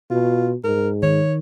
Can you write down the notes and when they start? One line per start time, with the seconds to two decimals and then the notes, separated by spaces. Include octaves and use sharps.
0.11 B2 F4
0.64 G#2 A#4
1.03 D#3 C#5